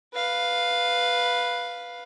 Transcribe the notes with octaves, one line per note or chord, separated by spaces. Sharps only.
B4 F5